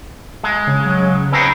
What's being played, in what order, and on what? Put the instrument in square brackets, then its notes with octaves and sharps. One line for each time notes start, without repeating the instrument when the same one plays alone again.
[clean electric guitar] G#3
[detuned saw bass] C#3
[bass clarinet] F#3
[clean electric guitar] C4 D#4 G#4 [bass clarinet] B4